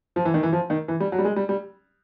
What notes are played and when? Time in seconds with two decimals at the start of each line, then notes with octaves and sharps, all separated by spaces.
0.16 F3
0.25 E3
0.34 D#3
0.43 E3
0.52 F3
0.70 D#3
0.88 E3
1.00 G3
1.12 F#3
1.19 G3
1.24 G#3
1.36 G3
1.49 G3